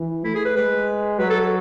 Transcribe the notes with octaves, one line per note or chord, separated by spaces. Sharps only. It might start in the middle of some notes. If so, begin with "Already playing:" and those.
Already playing: E3
A3 E4
G#4
B4
G#3 B4
F#3 B4
A4
A4